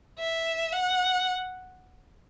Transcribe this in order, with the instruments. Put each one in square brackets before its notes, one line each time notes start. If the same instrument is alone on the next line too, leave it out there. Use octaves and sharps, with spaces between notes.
[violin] E5
F#5